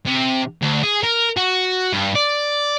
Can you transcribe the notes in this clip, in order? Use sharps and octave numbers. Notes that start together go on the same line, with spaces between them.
C3
D2
G#4
A#4
F#4
G2
D5